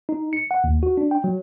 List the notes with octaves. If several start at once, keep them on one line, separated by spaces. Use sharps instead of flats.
D#4
C#7
F#5
D#2
F#4
D4
G5
F#3